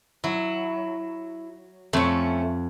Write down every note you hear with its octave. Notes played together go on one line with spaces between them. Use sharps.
F#3 E4
F2 A3 C#4